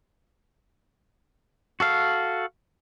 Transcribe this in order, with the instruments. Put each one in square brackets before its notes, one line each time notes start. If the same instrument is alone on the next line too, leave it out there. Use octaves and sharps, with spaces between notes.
[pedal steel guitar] F#4 A4 F5